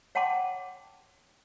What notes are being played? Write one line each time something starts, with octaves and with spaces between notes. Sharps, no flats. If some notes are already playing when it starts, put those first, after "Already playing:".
C#5 F#5 G5 A5 C6 D6